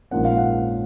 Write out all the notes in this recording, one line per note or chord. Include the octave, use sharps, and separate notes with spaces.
A#1 G#2 F3 A#3 C#4 F#5
F5
F#5